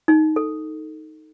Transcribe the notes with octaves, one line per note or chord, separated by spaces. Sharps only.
D#4
A4